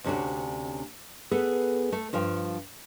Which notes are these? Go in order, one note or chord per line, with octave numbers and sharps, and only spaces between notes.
D2 C3 C#4 D4 F#4
B3 G#4 A4 B4
A3
G2 F3 F5 G5